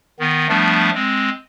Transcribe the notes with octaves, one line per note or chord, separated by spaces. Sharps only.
D#3 B3
F3 G3 A3 B3 D4
G#3 C4